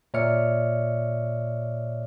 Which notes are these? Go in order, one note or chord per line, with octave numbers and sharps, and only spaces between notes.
A#2 C#5 D5 E5 F6 C#7